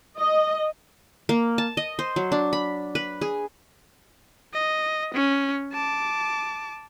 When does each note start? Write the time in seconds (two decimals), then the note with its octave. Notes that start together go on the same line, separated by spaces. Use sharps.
0.19 D#5
1.29 A#3
1.58 A5
1.77 D#5
1.99 C5
2.16 F#3
2.32 D4
2.53 B5
2.95 B4
3.21 G#4
4.54 D#5
5.14 C#4
5.73 A5 D6